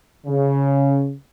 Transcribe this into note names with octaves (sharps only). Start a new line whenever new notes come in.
C#3